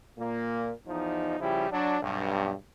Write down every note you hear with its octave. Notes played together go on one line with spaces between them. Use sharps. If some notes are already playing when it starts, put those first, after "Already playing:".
A#2 A#3
E2 F3 D#4
C#3 F3 G3 E4 G4
F#3 D4
B1 G2